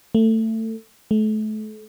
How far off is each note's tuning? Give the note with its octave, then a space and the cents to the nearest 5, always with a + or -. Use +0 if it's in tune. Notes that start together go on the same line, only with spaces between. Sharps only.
A3 +20
A3 -35